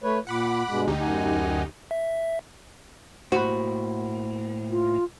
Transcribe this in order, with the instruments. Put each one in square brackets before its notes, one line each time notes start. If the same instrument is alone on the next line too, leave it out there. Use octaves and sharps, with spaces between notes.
[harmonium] A3 B4 C#5
[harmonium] A#2 [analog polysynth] F#5 B5 D6
[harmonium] G2 B2 G#3
[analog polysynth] D2 D#4 G4
[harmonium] F#2 F#5 G#5
[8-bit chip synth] E5
[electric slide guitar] A2 A#3 [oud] F#4 [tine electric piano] C5 B5
[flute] F4